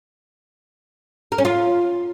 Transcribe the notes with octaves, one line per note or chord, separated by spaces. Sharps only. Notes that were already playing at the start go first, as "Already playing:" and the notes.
A#4
C#4
F4